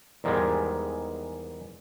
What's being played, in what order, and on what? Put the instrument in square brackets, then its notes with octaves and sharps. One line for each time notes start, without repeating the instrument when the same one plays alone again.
[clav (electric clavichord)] E2 G#2 D#3 G3 G#3